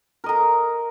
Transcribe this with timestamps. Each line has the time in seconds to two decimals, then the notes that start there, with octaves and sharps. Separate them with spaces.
0.24 A#4
0.26 D#5
0.29 A#5